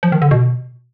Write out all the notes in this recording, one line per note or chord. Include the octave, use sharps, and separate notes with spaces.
F3
D#3
D3
B2